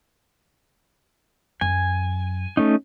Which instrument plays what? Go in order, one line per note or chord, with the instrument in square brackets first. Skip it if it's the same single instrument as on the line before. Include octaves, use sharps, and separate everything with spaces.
[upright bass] F#2 [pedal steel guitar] G#5
[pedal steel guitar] A3 C#4 D#4